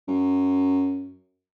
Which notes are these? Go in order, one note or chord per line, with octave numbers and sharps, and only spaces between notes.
F#2